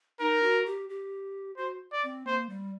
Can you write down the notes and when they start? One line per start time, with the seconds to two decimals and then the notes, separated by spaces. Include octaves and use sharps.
0.20 D#4 A#4
0.43 F#4
0.66 G4
0.89 G4
1.57 F#4 C5
1.92 D5
2.03 C4
2.27 A#3 C5
2.49 G3